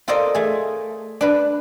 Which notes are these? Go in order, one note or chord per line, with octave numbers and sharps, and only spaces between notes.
F4 A4 A#4 C5 D5 D#5
A3 G#4
D4 B4